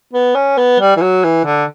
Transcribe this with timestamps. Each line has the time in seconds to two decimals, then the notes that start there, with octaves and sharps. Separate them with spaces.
0.13 B3
0.35 C#4
0.57 B3
0.80 G3
0.97 E3
1.01 F#3
1.24 E3
1.45 D3